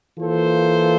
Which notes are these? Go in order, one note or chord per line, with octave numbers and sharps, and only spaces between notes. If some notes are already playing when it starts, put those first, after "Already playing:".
E3 A#3 F4 A4 C5